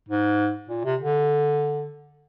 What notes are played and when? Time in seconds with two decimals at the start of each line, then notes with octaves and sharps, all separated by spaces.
0.09 G#2
0.69 A#2
0.84 C3
1.00 D3